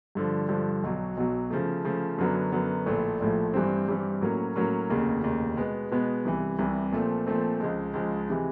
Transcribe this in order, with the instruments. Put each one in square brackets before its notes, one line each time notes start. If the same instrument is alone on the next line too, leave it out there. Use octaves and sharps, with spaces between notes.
[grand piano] G2 D3 F3
G2 D3 F3
B1 B2 F#3
B1 B2 F#3
C#3 F3 A3
C#3 F3 A3
F#2 D3 F#3 B3
F#2 D3 F#3 B3
A#1 A2 F3 A3
A#1 A2 F3 A3
G2 E3 G3 C4
G2 E3 G3 C4
A2 F#3 A#3 C#4
A2 F#3 A#3 C#4
F1 D#2 C#3
F1 D#2 C#3
B2 G#3 B3
B2 G#3 B3
C2 C3 E3
C2 C3 E3
A#2 F3 A3 C4
A#2 F3 A3 C4
C#2 C#3 F3 G#3
C#2 C#3 F3 G#3
C3 E3 G#3